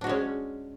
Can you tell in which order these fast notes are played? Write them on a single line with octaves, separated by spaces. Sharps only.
D4 F#4 G#3 C#4